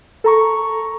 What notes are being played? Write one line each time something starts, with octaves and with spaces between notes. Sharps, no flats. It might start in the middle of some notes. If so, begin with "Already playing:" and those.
A4 A#5 C#6